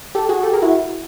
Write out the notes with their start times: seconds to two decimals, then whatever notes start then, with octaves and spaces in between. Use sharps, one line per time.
0.15 G4 A4
0.29 F#4 G#4
0.43 G4 A4
0.53 G#4 A#4
0.62 E4 F#4